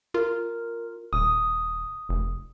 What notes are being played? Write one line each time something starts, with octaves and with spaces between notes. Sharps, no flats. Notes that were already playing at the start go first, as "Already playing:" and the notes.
F4 A#4
D#1 D#6
F1